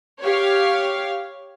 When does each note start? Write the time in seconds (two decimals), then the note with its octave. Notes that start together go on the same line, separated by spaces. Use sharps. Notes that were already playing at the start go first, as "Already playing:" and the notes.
0.23 G4 C#5 F5